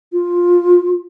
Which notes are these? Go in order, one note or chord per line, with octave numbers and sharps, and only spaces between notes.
F4